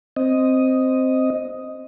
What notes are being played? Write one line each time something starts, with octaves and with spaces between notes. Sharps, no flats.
C4 D#5